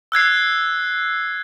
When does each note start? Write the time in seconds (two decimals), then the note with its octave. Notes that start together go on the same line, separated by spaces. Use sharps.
0.12 E6 F#6 G#6 C7